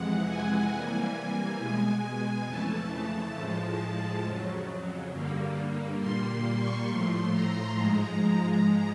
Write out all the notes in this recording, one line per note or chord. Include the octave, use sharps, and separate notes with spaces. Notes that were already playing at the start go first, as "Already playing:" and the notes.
Already playing: F2 C3 E3 G#3 F#5
G#5
C3 E3 G3 A#3
B2 G#3
F2 C#3 E3 A3 A5
A2 F3 G#3
F2 C#3 F#3
G2 D3 G3 A#3
A#2 G3 A#3 C6
C6
C#6
A2 F3 A3 C6
A#5
G#2 F3 G#3 A#5